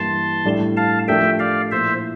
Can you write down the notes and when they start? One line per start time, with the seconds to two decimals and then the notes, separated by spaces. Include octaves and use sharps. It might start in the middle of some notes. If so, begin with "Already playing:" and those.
Already playing: G2 E3 A#3 E4 G4 A5 C6
0.45 A2 G3 D4 A4
0.77 F5 A5
1.08 F3 A3 D4 G4 A#4 E5 G5
1.39 D5 F5
1.71 A#2 F3 A#3 E4 C5 E5